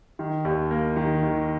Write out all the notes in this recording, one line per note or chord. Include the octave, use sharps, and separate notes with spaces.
D#3
D#2
A#3
D#3
D#3